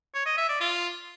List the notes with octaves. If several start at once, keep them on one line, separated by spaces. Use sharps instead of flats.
C#5
D#5
E5
D5
F4